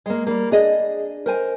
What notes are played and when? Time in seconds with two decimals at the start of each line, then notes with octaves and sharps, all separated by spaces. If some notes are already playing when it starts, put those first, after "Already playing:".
0.06 G#3 A#3
0.27 G3 A#3
0.51 D4 G#4 D#5
1.26 A#4 C5 G#5